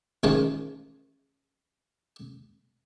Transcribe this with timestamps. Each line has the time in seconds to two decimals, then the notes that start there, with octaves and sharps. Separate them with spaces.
0.23 A1 D#3 G#3 F4 C5 A5